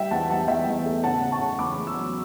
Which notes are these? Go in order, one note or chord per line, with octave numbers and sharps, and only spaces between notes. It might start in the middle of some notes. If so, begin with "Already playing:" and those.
Already playing: G3 E5 G5
E2 F#5 A5
G3 F#5 A5
E2 E5 G5
E2
A3
C#3 F#5 A5
C#3
A5 C#6
C#3
E2 B5 D6
E2
C#6 E6
F#3